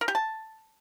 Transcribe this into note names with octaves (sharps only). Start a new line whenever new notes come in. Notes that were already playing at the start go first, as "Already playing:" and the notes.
A#4
G4
A5